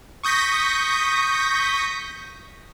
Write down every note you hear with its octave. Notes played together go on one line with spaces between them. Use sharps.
C#6 D#6 G6 A#6 B6